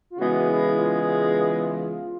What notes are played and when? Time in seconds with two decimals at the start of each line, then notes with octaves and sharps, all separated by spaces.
0.10 F4
0.18 C#3 E3 G#3 B3 F#4
0.48 E4
0.78 F4